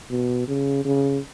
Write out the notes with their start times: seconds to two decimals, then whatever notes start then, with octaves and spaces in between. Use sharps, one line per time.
0.10 B2
0.48 C#3
0.85 C#3